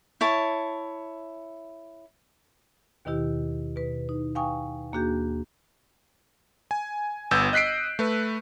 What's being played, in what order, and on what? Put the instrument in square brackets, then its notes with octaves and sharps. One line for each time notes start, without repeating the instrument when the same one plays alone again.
[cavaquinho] E4 C#5 A5
[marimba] D#2 B2 D#3 E4 G4
B2 B4
D#4
F5 G5 G#5 C#6 D#6
D#2 A#3 D4 F#4 G#4 G6
[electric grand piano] G#5
G1 B3 E6 G6
D#5 F#6 B6 C7 D7
A3 B4